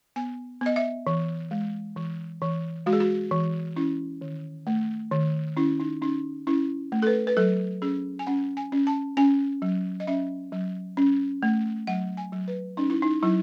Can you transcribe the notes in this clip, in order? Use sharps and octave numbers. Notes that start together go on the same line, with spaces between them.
B3 G#5
B3 D#5
E5
E3
G#3
E3
E3
G#3 F#4
G#4
F#4
E3
C#4 E4
D#3
A3
D#3
C#4 E4
D#4
C#4 D#4
C#4 E4
A3
A4
B4
B4
F#3 A4
C#4 G#4
G#5
C#4 F#5
G#5
C#4
A5
C#4 G#5
F#3
D#5
C#4 E5
F#3
C#4
A3
F#3 F#5
G#5
F#3
B4
C#4 D#4
E4
D#4
F#3 E4